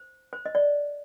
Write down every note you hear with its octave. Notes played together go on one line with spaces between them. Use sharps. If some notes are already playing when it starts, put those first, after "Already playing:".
Already playing: C5
C5
D#5
D5